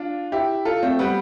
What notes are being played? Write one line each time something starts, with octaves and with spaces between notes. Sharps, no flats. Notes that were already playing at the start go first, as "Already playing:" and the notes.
Already playing: D4 F4
E4 G4
F4 A4
A3 C4
G3 B3